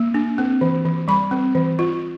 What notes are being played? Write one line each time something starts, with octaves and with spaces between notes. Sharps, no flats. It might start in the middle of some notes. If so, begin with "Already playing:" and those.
Already playing: A#3
D4
C4
E3
E3
G3 B5
C4
E3
F4